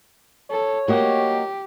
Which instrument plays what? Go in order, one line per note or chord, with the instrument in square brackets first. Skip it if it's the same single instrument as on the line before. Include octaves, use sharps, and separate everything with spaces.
[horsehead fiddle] A4 [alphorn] C#5
[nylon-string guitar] A#3 F#4 D#5 [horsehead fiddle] G4